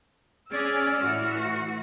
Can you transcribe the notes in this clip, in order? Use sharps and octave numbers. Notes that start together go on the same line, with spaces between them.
C#4 G#4 D5 E6 F6
A2 E3 F#4